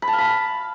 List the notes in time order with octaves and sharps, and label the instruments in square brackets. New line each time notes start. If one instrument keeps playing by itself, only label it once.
[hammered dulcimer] B5
A5
F5
B5